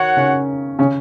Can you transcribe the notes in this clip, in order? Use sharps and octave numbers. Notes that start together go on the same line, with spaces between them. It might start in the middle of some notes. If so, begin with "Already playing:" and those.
Already playing: D#3 F#4 C#5 F#5
C#3 C#4
C#3 C#4